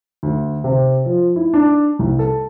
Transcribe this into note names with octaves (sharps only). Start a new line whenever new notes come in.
D2
C3
F3
E4
D4
C2
A4